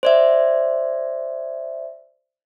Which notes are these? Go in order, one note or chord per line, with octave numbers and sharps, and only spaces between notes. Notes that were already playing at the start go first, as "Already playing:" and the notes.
C5 D5 E5